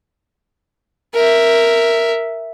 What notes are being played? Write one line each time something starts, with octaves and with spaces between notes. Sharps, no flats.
A#4 E5